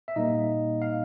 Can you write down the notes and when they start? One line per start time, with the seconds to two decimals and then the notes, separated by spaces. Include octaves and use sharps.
0.08 E5
0.16 A#2 G3 A#3 D#4 D#5
0.82 F5